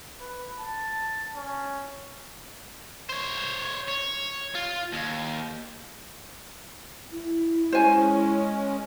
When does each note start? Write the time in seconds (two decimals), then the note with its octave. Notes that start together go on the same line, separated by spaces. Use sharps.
0.21 B4
0.60 A5
1.36 C#4
3.09 C5 C#5
3.88 C#5
4.55 F4
4.93 D#2
7.12 E4
7.72 G#3 C#4 C5 G#5